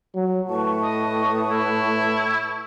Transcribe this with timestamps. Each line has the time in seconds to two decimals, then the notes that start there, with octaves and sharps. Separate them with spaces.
0.15 F#3
0.48 A2 B4 A5 C#6
0.82 D#5
1.51 E4